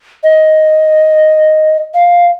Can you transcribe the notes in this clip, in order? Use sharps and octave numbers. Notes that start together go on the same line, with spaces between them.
D#5
F5